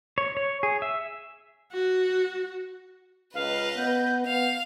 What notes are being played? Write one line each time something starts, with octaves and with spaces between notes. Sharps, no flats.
C#5
C#5
G#4
E5
F#4
C#2 B4 D#5 F5
B3 G6
B3 F5 F7